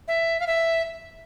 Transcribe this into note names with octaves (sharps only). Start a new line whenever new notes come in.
E5
F5
E5